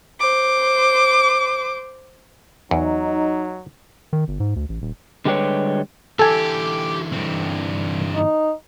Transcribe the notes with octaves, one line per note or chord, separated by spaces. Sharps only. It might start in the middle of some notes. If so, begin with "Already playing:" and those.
C5 D6
E2 F#3 D#4
D#3
G1
G#2
D2
A1
D#1
D3 G3 G#3 G4 B4 C#5
D3 E3 G4 A4 G#5
G2 C4
D#4